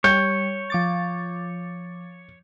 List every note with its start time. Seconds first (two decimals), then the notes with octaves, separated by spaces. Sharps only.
0.04 G3 C#5 G6
0.70 F3 D6 A6